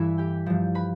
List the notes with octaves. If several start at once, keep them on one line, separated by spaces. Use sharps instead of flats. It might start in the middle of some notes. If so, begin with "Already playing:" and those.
Already playing: G2 E3 E4 E5 B5
G4 G5
G2 F3
B4 B5